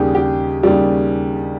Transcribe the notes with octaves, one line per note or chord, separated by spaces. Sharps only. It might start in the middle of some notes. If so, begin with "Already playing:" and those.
Already playing: D#2 C#3 G3 G4 G#4
G4
D#2 C#3 G3